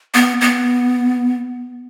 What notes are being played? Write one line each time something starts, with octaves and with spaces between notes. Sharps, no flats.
B3
B3